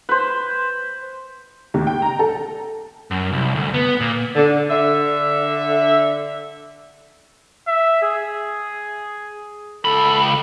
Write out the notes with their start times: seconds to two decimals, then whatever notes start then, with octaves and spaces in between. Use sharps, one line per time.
0.09 B4 C5
1.74 D#2
1.87 G5
2.02 A#5
2.19 A4
3.11 F#2
3.32 C2
3.55 D2
3.74 B3
4.00 A#2
4.35 D3
4.70 D3 E5
7.67 E5
8.03 G#4
9.85 C#2 A4 B5